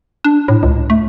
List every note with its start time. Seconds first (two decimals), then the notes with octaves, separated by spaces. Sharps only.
0.24 D4
0.48 A2
0.63 C#2
0.90 A3